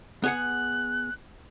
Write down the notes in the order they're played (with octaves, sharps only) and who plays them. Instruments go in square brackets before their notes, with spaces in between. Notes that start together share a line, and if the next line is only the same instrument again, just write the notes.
[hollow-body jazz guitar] B3 G#4 F#5 [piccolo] F#6